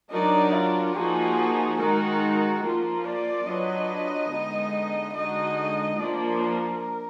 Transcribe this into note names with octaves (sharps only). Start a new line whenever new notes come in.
F#3 D4 D#4 F#4 A#4 D5
F4
F3 A#3 D#4 F#4 G#4
D#3 G#3 D#4 F#4 A#4
F3 A#3 F4 A#4
D5
F#3 D4 F4 B4 D#5
D3 G#3 B3 D#4
D3 G#3 D#4 F#4 D#5
F3 A#3 D4 D5
A#4